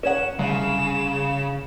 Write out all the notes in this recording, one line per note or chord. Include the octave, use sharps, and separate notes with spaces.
C#4 C#5 F#5 E7
C2 C#3 E7